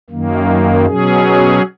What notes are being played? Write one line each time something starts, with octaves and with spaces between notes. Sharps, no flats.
F#2 D#3 A#3
B2 F#3 C#4 G#4